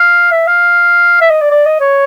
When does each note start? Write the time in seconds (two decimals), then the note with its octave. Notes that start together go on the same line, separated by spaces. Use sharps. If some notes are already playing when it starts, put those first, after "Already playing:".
Already playing: F5
0.31 E5
0.47 F5
1.21 E5
1.31 D#5
1.41 D5
1.51 D5
1.66 D#5
1.80 C#5